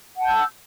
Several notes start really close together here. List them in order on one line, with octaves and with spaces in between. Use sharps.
F#5 A5 G6 E6